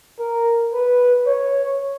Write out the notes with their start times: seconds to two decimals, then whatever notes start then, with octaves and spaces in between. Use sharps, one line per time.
0.19 A#4
0.73 B4
1.26 C#5